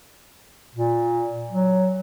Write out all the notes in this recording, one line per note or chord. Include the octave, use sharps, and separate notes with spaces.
A#2
F#3